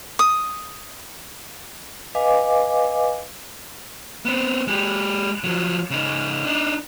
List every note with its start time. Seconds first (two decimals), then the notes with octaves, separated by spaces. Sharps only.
0.19 D#6
2.15 B4 D#5 F5 G#5 D6
4.25 B3 C4
4.67 G#3 G4
5.44 F3 F#3
5.90 C#3 D#4
6.45 D4 D#4